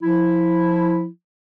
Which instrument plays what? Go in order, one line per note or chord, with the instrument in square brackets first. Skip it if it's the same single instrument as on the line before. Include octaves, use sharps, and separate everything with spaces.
[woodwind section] F3 E4